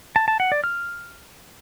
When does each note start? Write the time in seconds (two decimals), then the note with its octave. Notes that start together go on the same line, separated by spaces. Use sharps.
0.16 A5
0.28 A5
0.40 F#5
0.52 D5
0.64 F6